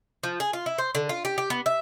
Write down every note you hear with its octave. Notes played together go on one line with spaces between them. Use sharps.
F3
G#4
F4
E4
C5
D3
F4
G4
G4
B3
E5